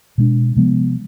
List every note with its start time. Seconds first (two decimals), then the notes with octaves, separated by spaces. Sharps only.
0.18 B2 G#3 D4
0.56 C3 F3 G#3 B3